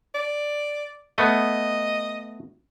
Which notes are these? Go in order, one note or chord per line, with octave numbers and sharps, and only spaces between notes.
D5
A3 B3 D#5